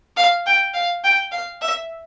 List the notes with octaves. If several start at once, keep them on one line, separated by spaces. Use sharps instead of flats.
F5
G5
F5
G5
F5
E5